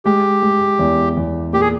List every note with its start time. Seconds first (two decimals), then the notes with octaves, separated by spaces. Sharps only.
0.05 G#3 G4
0.42 G#3
0.79 E2
1.17 E2
1.53 A#2 G4
1.61 G#4